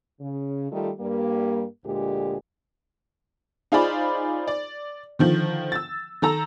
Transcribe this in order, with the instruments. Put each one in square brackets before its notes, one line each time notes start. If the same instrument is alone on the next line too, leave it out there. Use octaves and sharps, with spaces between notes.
[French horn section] C#3
D#3 G3 A3 F4 A4
G2 G3 A#3
D2 A#2 D3 G#3 G4
[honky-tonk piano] D#4 F4 G#4 C5 D5 B5
D5
D3 D#3 F3
E6 A6
D#3 A4 A#5 E6